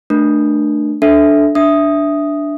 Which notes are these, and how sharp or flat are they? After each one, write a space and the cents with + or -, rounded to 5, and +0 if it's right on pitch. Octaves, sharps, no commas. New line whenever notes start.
A3 +0 D4 +20 A#4 +35
D4 +0 A4 -10 E5 -5
D4 +0 E5 +0 D#6 +0